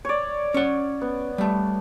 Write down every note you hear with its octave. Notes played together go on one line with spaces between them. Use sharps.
C#5 D5
C#4 F#5
B3
G3 A3